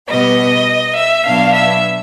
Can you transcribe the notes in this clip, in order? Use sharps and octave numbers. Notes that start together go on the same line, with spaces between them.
B2 G3 B3 D#5
E5
B2 F#3 B3 D4 F5
E5